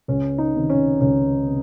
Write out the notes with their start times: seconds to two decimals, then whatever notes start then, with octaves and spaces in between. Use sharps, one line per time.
0.08 C#2 C#4
0.38 D#4
0.54 C3 D#3
0.70 C#4
1.01 C#2 C#4
1.46 C3